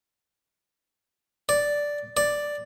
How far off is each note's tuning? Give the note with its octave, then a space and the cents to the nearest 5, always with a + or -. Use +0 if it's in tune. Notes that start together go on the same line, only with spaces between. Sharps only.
D5 -5
D5 +0